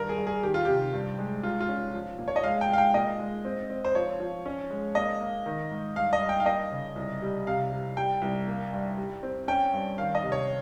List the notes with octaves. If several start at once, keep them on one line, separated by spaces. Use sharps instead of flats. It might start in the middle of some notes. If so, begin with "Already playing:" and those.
Already playing: G2 D#3 A#4
G#4
G2
G#4
D#3 G4
F4
C3 G4
G2
G#3
C#2 F4
F4
C#4
F3
A#2
C#5
D#5
G#3 F5
G5
G#3 F5
G5
A#2 D#5
G#3
C4
C4
C5
F3 C#5
F3
C#4
G#3
A#3 D#5
A#3
D#3
G#2
G2 F5
D#5
G2
G5
F5
A#3 D#5
C#3
C2
G3
C3 F5
G3
G3 G5
C2
A#3
G2
G3
C4
C#4 G5
G2
D#3 F5
D#5
C3
C#5